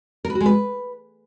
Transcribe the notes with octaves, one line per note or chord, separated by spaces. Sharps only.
A#4
B4
F#4
G#3
B4